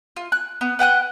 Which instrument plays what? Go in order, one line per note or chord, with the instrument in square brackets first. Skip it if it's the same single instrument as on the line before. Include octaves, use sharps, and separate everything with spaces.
[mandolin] F4
F#6
B3
B4 F#5 G5 F#6